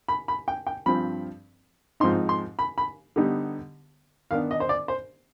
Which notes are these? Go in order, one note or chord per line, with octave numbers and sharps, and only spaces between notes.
B5
B5
G5
G5
G2 F3 C4 B5
G#2 F3 C4 D#4 C6
C6
B5
B5
D3 G3 B3 D#4
D#3 B3 D4 F5
D#5
C5
D5
C5